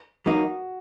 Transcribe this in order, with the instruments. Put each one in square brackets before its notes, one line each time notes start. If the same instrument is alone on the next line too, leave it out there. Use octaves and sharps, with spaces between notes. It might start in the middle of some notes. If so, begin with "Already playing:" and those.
[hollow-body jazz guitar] F#3 A#3 D#4 [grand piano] F#4